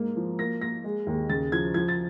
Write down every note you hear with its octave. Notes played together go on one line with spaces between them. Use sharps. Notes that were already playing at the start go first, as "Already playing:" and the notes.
Already playing: G#2 A#3
F3
A#3 A#6
A#3 A#6
G#3
D#2
C#3 A6
F3 G#6
F3 G#6
A6